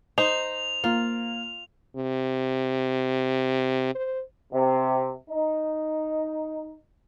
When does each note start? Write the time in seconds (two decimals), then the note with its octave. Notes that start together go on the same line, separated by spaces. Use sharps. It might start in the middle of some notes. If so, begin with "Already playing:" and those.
0.18 D#4 C5 F7
0.84 A#3 F4
1.96 C3
3.95 C5
4.52 C3
5.28 D#4